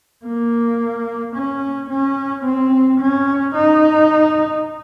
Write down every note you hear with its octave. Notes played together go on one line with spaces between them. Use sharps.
A#3
C#4
C#4
C4
C#4
D#4